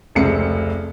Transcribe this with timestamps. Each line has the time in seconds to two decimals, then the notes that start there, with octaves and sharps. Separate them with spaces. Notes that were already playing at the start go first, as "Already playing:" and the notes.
0.15 F1 C#2 C3 C#7